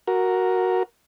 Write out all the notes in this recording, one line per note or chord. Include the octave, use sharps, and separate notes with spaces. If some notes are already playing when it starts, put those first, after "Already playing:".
F#4 A#4